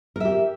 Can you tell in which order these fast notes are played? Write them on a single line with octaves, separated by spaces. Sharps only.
A#4 E5 G4